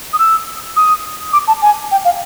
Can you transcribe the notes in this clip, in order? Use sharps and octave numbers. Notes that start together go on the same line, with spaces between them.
D#6
E6
D#6
D6
A5
G#5
G5
F5